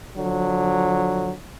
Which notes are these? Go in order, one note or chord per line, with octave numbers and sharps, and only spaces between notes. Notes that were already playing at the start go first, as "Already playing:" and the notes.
D3 F3 F#3